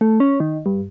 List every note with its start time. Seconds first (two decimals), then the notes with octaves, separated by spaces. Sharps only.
0.01 A3
0.20 C#4
0.40 D#3
0.66 G2